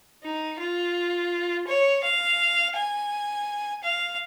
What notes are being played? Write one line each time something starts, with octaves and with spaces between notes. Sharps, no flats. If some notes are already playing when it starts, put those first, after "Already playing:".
D#4
F4
C#5
F5
G#5
F5